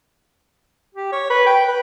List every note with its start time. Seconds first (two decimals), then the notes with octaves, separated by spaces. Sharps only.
0.95 G4
1.12 C#5
1.30 B4
1.46 G5
1.68 B4